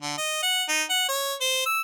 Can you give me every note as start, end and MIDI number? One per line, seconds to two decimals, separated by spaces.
0.02 0.14 50
0.17 0.39 75
0.42 0.63 78
0.68 0.83 63
0.89 1.07 78
1.08 1.34 73
1.40 1.64 72
1.66 1.81 88